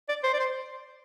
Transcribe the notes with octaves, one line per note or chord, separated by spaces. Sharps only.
D5
C5
D5
C5